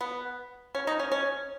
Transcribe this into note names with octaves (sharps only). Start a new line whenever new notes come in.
B3
C#4
D#4
C#4
C#4